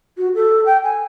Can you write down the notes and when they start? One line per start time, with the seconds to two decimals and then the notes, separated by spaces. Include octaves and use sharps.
0.17 F#4
0.35 A4
0.66 G5
0.83 G#5